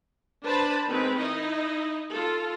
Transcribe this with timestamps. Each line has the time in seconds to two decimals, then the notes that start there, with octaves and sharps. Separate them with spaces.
0.43 D4 B4 C5 A5 B5
0.87 D#3 G#3 C4 B4
1.17 D#4 E4 D#5
2.10 F4 A4